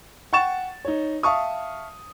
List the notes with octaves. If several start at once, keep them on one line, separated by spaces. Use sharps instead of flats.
F#5 G5 C#6 A6 E7
D#4 C#5
E5 F5 A5 C#6 D#6